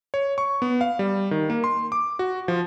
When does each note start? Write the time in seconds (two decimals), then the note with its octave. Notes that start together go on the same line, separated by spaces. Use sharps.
0.14 C#5
0.38 C#6
0.62 B3
0.81 F5
0.99 G3
1.31 D#3
1.50 A#3
1.64 C6
1.92 D6
2.19 F#4
2.48 F3